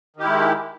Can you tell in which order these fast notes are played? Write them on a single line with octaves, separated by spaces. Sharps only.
D#3 G4 E4 G#3